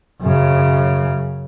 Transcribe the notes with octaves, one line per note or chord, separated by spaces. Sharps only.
F#2 C#3